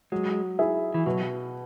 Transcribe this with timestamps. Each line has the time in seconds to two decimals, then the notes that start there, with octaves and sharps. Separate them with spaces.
0.12 F#3 G#3
0.59 E4 G#4 E5
0.94 E3
1.06 B2 F#3